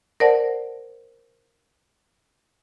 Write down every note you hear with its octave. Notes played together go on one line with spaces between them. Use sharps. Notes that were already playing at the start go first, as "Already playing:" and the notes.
A#4 C5 D5 F#5 A5